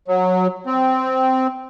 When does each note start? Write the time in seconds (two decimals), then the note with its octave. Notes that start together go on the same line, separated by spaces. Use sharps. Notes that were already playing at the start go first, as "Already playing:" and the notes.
0.08 F#3
0.66 C4